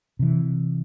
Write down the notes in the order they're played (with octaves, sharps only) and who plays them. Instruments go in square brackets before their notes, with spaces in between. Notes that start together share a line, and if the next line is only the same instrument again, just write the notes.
[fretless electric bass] C3 E3